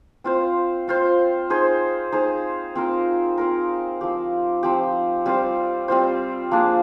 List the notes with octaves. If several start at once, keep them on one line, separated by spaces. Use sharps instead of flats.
C4 F4 C5
C4 F4 C5
D#4 G#4 C5
D#4 G#4 C5
C4 F4 A#4
C4 F4 A#4
F3 C4 G4
F3 C4 G4
G3 C4 F4 C5
G3 C4 F4 C5
F3 A#3 D4 G#4